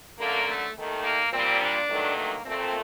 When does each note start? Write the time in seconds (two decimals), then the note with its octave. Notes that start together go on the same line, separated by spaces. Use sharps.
0.19 F#2 D3 F#3 A3 A#3
0.47 A3
0.75 D#2 D#3 A3
1.04 A#3
1.32 A#2 G3 C4
1.60 D4
1.89 G2 D#3 F#3 A3
2.17 A#3
2.45 A#2 A3 C4